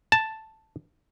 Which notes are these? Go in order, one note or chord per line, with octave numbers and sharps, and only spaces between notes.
A5